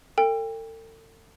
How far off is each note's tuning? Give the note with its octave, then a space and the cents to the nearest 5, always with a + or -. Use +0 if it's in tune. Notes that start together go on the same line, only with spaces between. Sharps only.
A4 +40 G5 +25